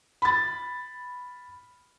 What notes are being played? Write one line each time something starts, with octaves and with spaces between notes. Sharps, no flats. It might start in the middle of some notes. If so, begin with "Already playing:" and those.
B5 A6